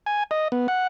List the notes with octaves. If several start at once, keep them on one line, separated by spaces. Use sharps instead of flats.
G#5
D#5
B3
F#5